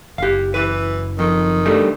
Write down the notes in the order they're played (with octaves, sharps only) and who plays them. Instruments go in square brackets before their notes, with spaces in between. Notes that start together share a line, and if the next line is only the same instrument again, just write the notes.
[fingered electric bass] F#1 [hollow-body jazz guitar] G4 F5
[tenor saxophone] E3 [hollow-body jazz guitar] B4
[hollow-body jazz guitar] F2 [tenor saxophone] D#3
[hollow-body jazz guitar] G3 A3 D4